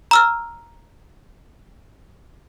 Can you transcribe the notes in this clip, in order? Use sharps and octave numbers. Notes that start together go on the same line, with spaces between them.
A#5 E6 F6